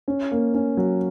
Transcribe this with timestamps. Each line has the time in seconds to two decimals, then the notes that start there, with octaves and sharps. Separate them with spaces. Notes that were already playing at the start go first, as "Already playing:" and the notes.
0.08 C#4
0.32 A#3
0.54 C#4
0.77 F#3